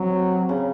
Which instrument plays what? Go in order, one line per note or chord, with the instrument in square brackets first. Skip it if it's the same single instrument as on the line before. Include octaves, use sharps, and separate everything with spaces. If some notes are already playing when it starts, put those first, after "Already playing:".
Already playing: [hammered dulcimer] C3 [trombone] F#3
[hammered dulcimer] C#3